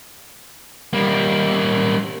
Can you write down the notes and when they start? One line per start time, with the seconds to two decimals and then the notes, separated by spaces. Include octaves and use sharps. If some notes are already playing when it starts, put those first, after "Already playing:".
0.93 G3 A#3